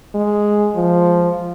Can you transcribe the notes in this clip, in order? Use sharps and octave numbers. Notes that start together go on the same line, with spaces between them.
G#3
F3